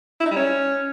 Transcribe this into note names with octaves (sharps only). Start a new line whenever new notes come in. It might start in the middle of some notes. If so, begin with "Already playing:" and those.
E4
D#4
G3
C#4